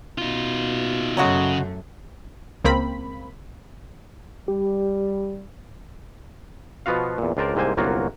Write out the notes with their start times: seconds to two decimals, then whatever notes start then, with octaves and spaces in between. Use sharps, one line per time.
0.18 B2 D#4 F4
1.17 F#2 C#3 F#3 G#3 A3 F#4
2.65 C#2 A#3 C4 B5
4.48 G3 G4
6.86 B2 F3 B3 F4 F#4 F5
7.18 E2 A#2
7.37 C#2 D4 F4 A#4 C5 D5
7.55 C2 G#2 C3 A#3 C5 G#5
7.77 G1 C2 F#3 A#3 F4 F#4